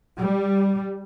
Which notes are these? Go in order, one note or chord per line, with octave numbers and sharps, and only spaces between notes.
G3